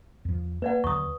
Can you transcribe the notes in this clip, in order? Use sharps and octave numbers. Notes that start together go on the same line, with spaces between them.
E2 F3
A#3 B4 D5 F#5
D#2 D3 F#3 C#6 D#6